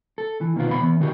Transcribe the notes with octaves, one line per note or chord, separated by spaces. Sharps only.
A4
E3
B2 D#3 B3 F4
F2 B2 B5
E2 E3 B3
D3 D#3 B3 F#4 G4